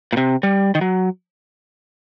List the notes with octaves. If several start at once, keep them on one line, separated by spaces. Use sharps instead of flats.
A#2
C3
G3
D#3
F#3